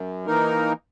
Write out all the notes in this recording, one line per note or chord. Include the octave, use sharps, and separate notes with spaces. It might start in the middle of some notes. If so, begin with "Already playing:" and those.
Already playing: F#2
E3 A#3 D#4 A#4